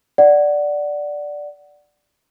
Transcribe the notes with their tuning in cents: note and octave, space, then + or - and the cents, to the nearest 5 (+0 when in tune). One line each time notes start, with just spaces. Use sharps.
D5 +0 F#5 +10